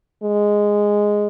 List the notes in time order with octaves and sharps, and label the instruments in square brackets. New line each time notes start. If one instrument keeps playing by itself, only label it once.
[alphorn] G#3